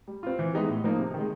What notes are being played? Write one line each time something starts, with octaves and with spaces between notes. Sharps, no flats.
G3
C4 F4
E3
G#3 B3 D#4 G4
A2
F3 A#3 D#4
C3
D#3 G#3